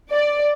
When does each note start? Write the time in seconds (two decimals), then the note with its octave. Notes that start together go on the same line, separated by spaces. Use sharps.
0.11 D5